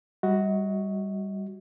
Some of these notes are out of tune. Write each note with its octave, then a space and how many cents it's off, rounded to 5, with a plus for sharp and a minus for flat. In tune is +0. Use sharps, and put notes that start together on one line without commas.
G3 +0 F#4 +0 D#5 +40